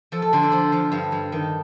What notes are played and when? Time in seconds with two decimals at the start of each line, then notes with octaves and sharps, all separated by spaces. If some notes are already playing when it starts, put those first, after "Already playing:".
0.12 F3 A4
0.22 A4
0.33 D3 C5
0.43 D5
0.52 F3 C5
0.72 F3 F5
0.92 G2 F5
1.12 G2
1.32 D#3